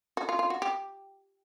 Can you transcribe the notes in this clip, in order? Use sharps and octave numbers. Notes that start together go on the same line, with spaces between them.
F#4
F4
F4
F#4
G4